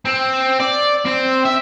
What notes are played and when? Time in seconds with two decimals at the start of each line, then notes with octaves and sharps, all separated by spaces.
0.05 C4
0.60 D5
1.05 C4
1.45 E5